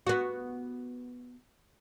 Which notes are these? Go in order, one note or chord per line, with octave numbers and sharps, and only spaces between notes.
B3 F#4